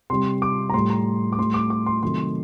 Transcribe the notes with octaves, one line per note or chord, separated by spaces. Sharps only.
C3 G3 C6
D6
A#5
A2 G3 C6
A#5
D6
A2 G3 C6
D6
D6
C6
C3 D#3 F#3 A3 C6